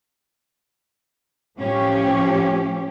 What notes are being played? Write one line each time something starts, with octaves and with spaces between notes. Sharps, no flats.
A2 F3 C#4 G4